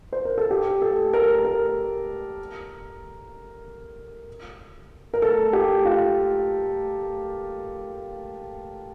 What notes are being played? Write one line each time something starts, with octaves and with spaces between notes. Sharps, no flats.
C5
A#4
A4
G4
A4
A#4
A#4
A#4
A4
G4
F4